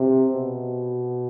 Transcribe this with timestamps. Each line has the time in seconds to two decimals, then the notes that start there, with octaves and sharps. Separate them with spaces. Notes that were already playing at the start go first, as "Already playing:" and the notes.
Already playing: C3
0.33 B2